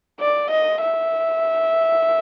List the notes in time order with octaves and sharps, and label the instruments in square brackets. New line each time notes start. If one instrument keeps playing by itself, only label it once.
[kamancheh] D5
D#5
E5